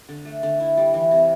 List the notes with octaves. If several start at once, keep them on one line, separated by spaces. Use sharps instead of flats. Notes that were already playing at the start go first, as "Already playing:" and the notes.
D3
A3
D3
E4
G3
E3
C3